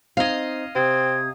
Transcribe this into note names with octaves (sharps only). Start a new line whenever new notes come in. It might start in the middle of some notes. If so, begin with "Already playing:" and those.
C4 D#4 D#5 F5 G#6
C3 C4 D#6 G#6